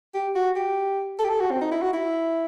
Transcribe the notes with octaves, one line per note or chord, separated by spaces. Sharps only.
G4
F#4
G4
A4
G4
A4
F#4
C4
D#4
E4
F#4
E4